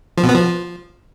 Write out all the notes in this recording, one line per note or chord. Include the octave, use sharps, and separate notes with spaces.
F3
B2
B3
F3